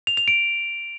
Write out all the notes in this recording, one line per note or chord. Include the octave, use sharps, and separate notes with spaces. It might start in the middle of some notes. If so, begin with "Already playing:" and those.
F7
F7
D7